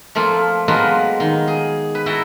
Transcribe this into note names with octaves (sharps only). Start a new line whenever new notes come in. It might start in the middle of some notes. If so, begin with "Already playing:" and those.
F3 A3 A#3 C4 F4
F#3 G#3 A#3 B3 F4 B4
D#3
G#4
B4
E4 F#4 G5 A5 A#5